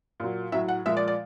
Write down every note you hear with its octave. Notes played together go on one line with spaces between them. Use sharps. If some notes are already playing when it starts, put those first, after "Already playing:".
A#2 F#3
A2 F#3 E5
F#5
A#2 F3 G#3 E5
D5
D5